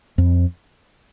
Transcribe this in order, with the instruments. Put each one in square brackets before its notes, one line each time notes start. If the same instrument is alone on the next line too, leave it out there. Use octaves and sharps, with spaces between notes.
[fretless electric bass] F2